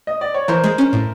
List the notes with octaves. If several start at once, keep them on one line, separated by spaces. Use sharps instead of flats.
D#5
D5
C#5
E3 A#4 C5
G#3
C#4
A2